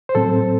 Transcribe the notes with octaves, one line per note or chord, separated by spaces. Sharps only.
C5
A2 F#3 C4 A4